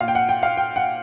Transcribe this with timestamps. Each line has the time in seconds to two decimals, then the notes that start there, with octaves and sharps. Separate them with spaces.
0.01 A#2 F5
0.08 G5
0.15 F#5
0.29 G5
0.43 F5
0.57 G5
0.76 F#5